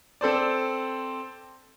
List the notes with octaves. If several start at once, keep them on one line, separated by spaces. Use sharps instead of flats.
C4 A4 C5 D5